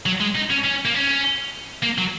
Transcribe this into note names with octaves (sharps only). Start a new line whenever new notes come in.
F#3
G#3
D#4
C#4
C#4
A#3
C#4
A#3
F#3